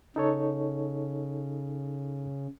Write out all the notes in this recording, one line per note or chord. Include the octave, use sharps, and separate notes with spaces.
C#3 D#4 A4 C#5